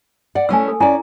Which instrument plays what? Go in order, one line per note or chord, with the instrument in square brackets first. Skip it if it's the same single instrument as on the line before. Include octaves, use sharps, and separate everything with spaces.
[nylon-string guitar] D5 F#5
[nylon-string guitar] A3 C#4 E4 [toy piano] G#5 E6
[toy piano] A4
[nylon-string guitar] C#4 D5 [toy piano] E4 G#5 A#5